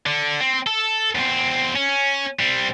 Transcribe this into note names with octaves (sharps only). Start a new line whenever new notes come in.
D3
C4
A4
E2 C4
C#4
G3 C4